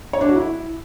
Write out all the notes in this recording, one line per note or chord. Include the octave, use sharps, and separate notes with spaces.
C#5
D4
F#4
E4